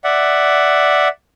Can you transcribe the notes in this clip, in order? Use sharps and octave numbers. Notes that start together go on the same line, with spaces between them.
D5 E5 F#5